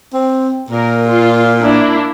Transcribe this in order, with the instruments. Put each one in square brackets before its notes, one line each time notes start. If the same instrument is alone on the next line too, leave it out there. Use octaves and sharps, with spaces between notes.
[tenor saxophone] C4
[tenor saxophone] A#2 [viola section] A#4
[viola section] F4
A#3 D4 E4